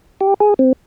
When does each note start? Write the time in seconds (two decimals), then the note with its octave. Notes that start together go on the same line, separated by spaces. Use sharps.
0.21 G4
0.40 G#4
0.59 C4